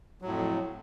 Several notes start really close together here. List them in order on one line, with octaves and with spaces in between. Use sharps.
F#3 A2 F2